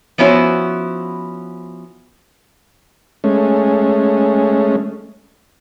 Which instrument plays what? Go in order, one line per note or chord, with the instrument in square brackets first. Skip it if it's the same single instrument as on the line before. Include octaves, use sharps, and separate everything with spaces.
[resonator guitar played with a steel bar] F3 B3 C#4 E4 F#4 C5
[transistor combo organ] G#3 A3 C#4